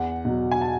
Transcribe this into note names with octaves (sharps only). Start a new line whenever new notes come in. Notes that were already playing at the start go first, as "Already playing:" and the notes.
Already playing: E2 F#5
B2 F#3
G#5
A5